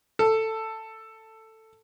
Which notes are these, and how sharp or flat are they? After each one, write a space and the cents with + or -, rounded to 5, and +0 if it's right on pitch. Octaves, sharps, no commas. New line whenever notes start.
A4 +10